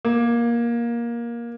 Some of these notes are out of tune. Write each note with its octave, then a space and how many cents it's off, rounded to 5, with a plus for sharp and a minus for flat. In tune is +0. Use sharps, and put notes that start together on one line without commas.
A#3 +15